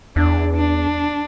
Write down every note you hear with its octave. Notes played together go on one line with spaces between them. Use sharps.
E2 D4
D4